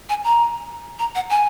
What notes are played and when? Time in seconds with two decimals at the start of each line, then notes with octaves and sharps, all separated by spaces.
0.09 G#5
0.24 A#5
0.99 A#5
1.15 F#5
1.30 G#5